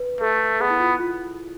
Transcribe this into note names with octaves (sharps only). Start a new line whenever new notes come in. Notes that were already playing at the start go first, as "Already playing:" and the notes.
Already playing: B4
A3 A4
B3 G#4
E4
F4
F4